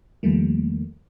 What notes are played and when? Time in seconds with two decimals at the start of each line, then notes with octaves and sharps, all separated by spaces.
0.23 E2 D#3 F3 G3 A3 A#3